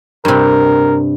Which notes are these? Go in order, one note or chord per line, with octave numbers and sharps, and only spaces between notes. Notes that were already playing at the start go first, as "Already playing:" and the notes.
G2 C3 A#4